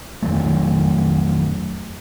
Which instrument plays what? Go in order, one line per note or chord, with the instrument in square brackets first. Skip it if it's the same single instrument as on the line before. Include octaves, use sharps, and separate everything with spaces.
[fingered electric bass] F2 D#3 F#3 A3